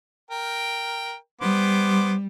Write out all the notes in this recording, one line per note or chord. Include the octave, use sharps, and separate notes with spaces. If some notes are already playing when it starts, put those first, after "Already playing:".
A#4 G5
G3 B3 C5 D6